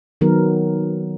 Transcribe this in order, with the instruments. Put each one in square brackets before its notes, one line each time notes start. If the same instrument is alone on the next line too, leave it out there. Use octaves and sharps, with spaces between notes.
[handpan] D#3 F#3 B3 A#4